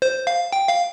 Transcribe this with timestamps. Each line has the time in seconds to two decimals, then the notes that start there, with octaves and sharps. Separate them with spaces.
0.02 C5
0.27 F5
0.53 G5
0.69 F5